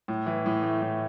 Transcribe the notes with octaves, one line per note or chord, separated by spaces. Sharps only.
A2
E3
A2
A3
A2